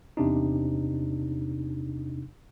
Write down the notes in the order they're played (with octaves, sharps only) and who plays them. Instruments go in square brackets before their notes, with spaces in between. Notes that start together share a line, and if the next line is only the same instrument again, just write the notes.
[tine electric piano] E2 C3 D4 D#4